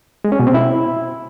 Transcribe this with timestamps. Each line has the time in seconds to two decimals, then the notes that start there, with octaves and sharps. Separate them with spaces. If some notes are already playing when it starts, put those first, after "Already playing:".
0.24 G#3
0.32 C#4
0.39 B2
0.47 C4
0.54 E4